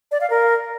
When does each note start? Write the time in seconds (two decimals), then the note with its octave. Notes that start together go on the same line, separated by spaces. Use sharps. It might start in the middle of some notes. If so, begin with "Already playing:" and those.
0.11 D5
0.21 F5
0.30 A#4